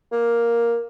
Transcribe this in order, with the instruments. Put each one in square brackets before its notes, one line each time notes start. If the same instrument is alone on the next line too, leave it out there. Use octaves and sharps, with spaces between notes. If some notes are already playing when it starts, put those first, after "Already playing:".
[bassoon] A#3